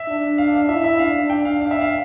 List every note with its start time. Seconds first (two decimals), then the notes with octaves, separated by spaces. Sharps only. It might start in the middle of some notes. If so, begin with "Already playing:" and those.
Already playing: E5
0.08 D4
0.38 F5
0.54 F5
0.69 E4 E5
0.84 E5
0.99 D4 F5
1.30 D4 G5
1.45 F5
1.61 D4 F5
1.71 E5
1.81 F5